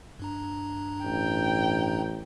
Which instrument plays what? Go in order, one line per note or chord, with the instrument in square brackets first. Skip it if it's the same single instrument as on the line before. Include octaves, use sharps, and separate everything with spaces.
[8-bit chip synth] G2 D4 A#5
[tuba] A1 [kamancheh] G5